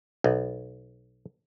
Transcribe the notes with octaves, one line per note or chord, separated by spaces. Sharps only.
B1